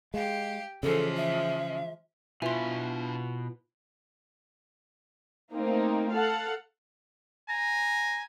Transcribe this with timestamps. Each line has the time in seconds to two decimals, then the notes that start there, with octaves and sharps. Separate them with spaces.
0.14 G#3 G4 F5
0.83 C#3 E3 F3 G#3 A4
1.17 E5
2.42 B2 D4 E4 F4 B4 E5 G#5 C6
5.54 A3 A#3 C4 D#4
6.13 A4 F5 F#5
7.49 G#5 A#5